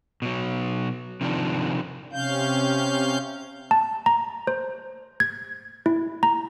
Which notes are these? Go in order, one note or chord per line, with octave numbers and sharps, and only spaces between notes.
B2 F#3
C3 D#3 F3 D4
C3 C#4 F5 G6
A5
A#5
C5
G#6
E4
A#5